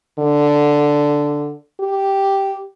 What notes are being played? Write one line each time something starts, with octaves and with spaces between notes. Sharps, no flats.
D3
G4